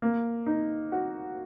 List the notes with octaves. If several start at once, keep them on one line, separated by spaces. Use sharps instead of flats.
A#3
D#4
F#4